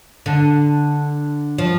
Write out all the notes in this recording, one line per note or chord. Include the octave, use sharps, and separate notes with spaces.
D3
F3